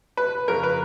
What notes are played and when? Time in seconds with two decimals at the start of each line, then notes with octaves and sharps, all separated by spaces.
0.17 B4
0.48 F2 C#3 A#4
0.63 B4